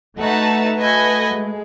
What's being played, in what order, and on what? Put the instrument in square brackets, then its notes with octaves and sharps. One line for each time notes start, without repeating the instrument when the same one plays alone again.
[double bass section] A3 [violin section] D#4 F#4 B4 F#5 A5
[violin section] F#4 B4 D#5 G#5
[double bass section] G#3